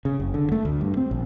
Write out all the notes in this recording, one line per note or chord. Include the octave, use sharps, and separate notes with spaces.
C#3
F#1
D3
A3
D2
G2
C4
A#1